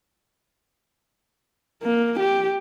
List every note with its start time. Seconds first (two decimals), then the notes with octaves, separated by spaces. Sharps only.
1.83 A#3
2.20 G4